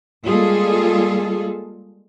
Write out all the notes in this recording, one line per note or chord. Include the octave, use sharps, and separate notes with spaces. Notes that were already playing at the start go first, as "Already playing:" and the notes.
G3 G#3 A#3 F4 G#4 A4